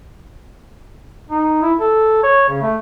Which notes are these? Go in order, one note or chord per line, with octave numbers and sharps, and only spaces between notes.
D#4
E4
A4
C#5
C#3
A3